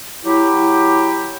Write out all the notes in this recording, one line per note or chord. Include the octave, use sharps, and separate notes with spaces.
F#3 E4 G4